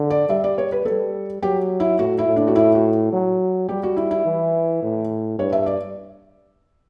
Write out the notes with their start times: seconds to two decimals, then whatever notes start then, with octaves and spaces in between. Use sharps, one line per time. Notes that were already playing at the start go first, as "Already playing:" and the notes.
Already playing: D3
0.10 D5
0.29 G3 E5
0.44 D5
0.58 C#5
0.72 B4
0.85 G3 A4
1.43 F#3 G4
1.80 E4
1.99 A2 F#4
2.18 E4
2.28 A2
2.36 D4
2.47 F#4
2.56 E4
2.75 F#4
3.13 F#3
3.68 G3 G4
3.83 F#4
3.97 E4
4.11 E4
4.25 E3
4.82 A2
5.39 G2 C#5
5.52 E5
5.66 D5